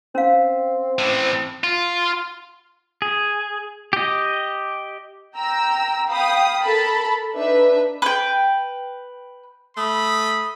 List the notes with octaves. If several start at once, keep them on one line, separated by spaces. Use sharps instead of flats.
C4 C#4 F5
A2 E3
F4
G#4
G4 D#5
G5 A#5 E6
F5 G5 B5 D#6
A4 A#4 A5 B5
D4 D#4 B4 E5
B4 G5
A3 B5 D#6